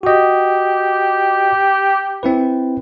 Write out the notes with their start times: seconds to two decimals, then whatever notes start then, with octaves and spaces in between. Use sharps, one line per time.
0.03 F#4 G4 D#5
2.23 C4 E4 B4